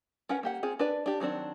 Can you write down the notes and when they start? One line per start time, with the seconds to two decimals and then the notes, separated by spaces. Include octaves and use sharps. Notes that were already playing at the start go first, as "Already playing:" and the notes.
0.29 C#4 A#4 B4 F#5
0.43 A#3 G4 F#5
0.63 C4 F4 G#4
0.79 D4 B4 D5
1.06 D4 G4
1.20 D#3 F#3 C4 D4